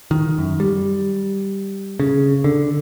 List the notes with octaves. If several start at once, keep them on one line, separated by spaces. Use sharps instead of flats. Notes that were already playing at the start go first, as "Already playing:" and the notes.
D#3
F#2
G3
C#3
D3